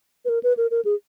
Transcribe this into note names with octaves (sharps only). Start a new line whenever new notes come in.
B4
A#4
B4
A#4
A#4
G#4